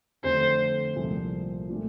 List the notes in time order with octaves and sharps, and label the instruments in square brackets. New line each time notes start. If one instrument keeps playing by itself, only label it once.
[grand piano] F2 D3 A3 C4 [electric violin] C5
[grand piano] C2 A#2 F3 C4
A#2 A3 D4 F4